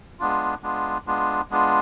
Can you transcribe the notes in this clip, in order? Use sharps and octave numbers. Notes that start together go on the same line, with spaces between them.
G#3 B3 D4 F4
G#3 B3 D4 F4
G#3 B3 D4 F4
G#3 B3 D4 F4